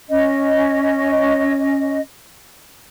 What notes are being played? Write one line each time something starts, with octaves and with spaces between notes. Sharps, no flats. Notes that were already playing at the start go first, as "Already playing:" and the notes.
C#4 D#5